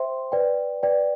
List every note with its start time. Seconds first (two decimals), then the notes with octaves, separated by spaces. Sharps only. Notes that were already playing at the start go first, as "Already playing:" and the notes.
Already playing: C5 E5 G5 C6
0.32 B4 D5 G5
0.83 B4 D5 G5